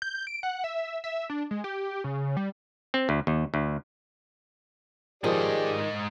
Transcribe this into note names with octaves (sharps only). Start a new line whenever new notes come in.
G6
D7
F#5
E5
E5
D4
G#3
G4
C#3
G3
C4
D2
D#2
D2
G#2 D#3 F3 G4 G#4 D5 D#5